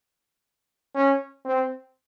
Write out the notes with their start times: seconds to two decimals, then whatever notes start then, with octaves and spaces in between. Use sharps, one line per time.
0.95 C#4
1.45 C4